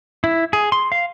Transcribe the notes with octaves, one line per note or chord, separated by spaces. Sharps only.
E4
G#4
C6
F5